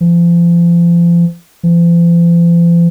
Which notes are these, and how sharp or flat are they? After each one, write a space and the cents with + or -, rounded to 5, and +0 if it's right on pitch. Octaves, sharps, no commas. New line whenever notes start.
F3 -35
F3 -45